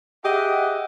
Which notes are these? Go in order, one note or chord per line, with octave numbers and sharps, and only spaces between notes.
G4 G#4 D#5 E5 F#5